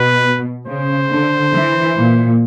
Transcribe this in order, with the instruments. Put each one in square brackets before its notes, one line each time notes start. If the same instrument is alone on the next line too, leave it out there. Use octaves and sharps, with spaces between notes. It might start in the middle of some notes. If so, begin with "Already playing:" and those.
Already playing: [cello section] B2 [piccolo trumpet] B4
[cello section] C#3 [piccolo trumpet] C5
[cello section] D3
E3
A#2